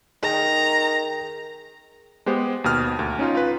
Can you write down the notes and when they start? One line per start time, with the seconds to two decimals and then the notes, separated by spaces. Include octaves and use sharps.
0.23 D#3 G#4 A#4 G5 A#5
2.26 G#3 B3 G4 C5
2.64 D#2 B2 D#6 F6
2.99 D2
3.19 C#4 D#4 F4
3.35 F4 B4